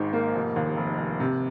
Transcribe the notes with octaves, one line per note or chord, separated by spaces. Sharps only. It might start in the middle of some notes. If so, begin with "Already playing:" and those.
Already playing: G#1 G#2 D#3
A#3
F1
D#2
F1
F1
C3